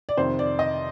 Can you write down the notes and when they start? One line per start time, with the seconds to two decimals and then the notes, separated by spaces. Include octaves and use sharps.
0.09 D5
0.17 F2 C3 D#3 C5
0.39 D5
0.59 D#5